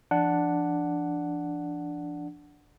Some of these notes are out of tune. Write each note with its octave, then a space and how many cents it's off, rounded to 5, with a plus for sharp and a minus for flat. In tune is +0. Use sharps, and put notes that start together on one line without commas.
F3 -35 D4 +0 F#5 +0